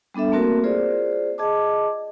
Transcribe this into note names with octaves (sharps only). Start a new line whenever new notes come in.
G3 B3 D4 A4 E5
A3 A#3 C4 F#4 A#4
F4 G#4 C5 D5
G#4 D#5 A5 D6